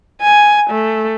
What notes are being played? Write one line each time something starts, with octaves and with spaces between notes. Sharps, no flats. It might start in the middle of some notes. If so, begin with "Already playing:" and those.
G#5
A3